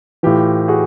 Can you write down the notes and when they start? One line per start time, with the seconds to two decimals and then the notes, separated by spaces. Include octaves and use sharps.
0.23 A2 E3 F4 G4
0.68 F#4 G#4